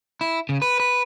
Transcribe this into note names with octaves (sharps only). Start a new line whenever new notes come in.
E4
C#3
B4
B4